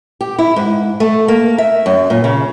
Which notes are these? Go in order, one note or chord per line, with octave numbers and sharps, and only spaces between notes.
G4
E4
G#2
A3
A#3
E5
F#2
A#2
C#3